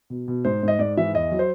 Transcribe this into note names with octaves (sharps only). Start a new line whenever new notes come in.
B2
B2
G#2 C5
G#2 D#5
G#2 D5
E3 E5
E2 D#5
F#3
C5